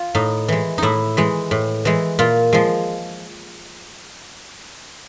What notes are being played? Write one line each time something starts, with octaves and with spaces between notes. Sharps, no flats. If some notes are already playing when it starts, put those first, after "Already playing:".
Already playing: F4
A2 D#4
E3 G#3
A2 D#4 E4
E3 G#3
A2
E3 G#3
A#2 F4
F3 G#3